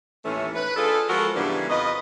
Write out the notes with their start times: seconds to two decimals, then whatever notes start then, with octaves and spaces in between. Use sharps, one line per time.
0.25 D#2 A2 E3 A3 C#4
0.55 B4
0.76 D4 F4 G#4 A4
1.09 F3 G#3 B3 F#4 A4 A#4
1.36 G#2 C#3 E3 G3 B3 D4
1.70 F2 F4 B4 D#5